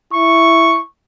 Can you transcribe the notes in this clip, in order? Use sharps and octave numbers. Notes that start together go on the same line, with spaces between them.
E4 C#6